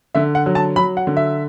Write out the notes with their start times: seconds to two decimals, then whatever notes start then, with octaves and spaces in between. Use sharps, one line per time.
0.15 D3 E5
0.35 F#5
0.46 F#3
0.55 A5
0.76 F#3 B5
0.97 F#5
1.07 D3
1.17 E5